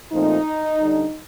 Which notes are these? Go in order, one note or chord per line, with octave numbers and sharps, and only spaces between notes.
A#2 F3 A3 C4 D#4
D3 G3 D4